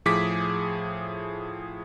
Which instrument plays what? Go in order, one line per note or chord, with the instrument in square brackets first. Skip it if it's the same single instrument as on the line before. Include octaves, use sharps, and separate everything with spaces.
[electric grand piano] A2 F3 G#4 D6 B6